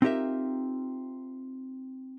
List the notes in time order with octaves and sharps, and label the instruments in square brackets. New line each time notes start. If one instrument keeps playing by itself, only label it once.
[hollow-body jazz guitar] C4 D#4 F4 G4 A#4 E5